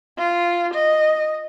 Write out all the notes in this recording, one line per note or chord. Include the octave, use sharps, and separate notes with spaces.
F4
D#5